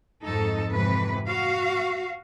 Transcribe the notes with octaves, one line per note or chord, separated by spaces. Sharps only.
F2 G#2 D#4 A4
F2 G#2 C3 E3 B4
F#4 F5